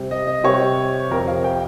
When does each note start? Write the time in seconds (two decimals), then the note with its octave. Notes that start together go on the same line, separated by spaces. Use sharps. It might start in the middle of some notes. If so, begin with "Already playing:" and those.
Already playing: C3 G3 C4
0.11 D#5
0.27 D#5
0.44 C3 G3 C4 C#5
1.10 F2 C3 F3 A#4
1.27 F5
1.44 G5